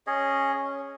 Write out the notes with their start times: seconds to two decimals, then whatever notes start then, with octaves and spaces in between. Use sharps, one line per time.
0.07 C#4 G#4 C#5 D#5
0.54 C#4